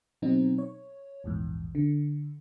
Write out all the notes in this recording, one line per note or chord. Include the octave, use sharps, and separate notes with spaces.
B2 F#3 C4 D#4
C#5
A#1 E2 G#2
D3